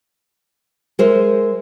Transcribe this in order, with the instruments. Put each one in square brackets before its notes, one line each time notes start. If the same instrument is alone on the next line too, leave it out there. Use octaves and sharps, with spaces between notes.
[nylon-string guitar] G#3 A#4 C5 E5